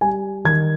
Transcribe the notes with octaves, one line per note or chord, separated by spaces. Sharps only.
G3 G#5
D#3 G#6